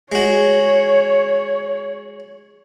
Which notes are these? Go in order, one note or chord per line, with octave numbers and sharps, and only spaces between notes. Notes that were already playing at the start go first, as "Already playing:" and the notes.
G#3 F#4 C#5